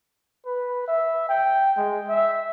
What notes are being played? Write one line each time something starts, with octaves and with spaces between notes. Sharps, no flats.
B4
E5
G5
G#3
E5